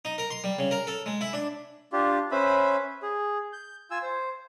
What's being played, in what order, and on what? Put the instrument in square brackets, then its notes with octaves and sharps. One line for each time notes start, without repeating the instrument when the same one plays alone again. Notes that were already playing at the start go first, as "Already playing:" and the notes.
[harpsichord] D#4
A#4
C6
G3
C#3
A#4
A4
G#3
E4
D4
[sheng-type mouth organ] D4 F4 G4
C#4 B4 C5 E5 B5
G#4
G6
F4 G#5 E6
C5